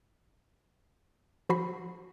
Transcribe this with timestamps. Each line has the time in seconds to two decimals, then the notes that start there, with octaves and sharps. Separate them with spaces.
1.49 F3 F#4 B5 C7